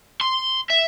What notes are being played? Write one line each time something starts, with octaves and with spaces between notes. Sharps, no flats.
C6
E5